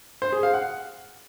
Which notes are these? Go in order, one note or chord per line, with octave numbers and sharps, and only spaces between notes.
C5
G#4
F5
F#5